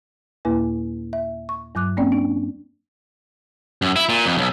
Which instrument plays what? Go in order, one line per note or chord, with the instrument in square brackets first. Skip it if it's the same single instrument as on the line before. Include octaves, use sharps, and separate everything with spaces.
[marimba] D#2 A#2 A#3 E4 B4 G#5
E5
C#6
G2 F#3 D6 F#6
A#3 C4 C#4 D5 G5
D4
[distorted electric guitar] F#2
E4
A#2
F2
B1